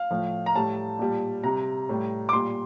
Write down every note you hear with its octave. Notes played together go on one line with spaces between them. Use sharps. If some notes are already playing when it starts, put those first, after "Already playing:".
Already playing: F5
A2 F3
A#5
A2 G3 A5
A#2 G3
C3 G3 A#5
A2 G3
D6
A#2 G3 C6